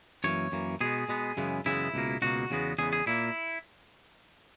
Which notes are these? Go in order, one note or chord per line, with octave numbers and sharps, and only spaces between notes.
F#2 E3 A#3 C#5
F#2 E3 A#3
B2 G#3 B3 G#4
B2 G#3 B3
F#2 C#3 E3 G#3 B3
F#2 C#3 E3 G#3 B3 E4
C#2 B2 A#3
C#2 B2 A#3 F#4
E2 C#3 G#3 B3
E2 C#3 G#3 B3 G#4
G#4
A#2 A#3 E4